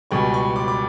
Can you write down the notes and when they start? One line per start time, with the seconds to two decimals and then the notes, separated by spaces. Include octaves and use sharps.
0.11 C#2 B2 G3 C#6
0.34 C#6
0.56 D6
0.68 D6